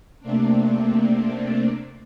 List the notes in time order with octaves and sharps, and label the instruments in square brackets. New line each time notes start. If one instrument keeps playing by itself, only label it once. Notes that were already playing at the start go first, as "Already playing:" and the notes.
[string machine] C3 A3 A#3 C4 D4